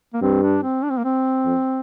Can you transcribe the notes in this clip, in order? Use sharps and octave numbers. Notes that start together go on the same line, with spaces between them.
A#3
G2 C4
D4
C4
D4
C4
A#3
C4
F2